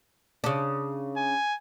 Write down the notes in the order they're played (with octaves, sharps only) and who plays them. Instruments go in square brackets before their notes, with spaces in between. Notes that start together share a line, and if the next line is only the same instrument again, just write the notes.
[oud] C#3 D4
[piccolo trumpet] G#5